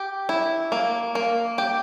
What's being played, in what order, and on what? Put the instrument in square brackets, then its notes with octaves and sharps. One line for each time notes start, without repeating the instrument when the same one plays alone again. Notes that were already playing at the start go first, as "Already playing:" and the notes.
Already playing: [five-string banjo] G4
E4
A#3
A#3
G4